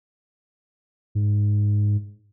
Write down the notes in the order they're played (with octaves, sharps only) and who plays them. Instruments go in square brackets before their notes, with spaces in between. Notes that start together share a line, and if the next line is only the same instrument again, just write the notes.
[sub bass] G#2